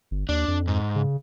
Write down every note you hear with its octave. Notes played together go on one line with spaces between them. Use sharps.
G1
D#2 D4
F2
G#2
C#3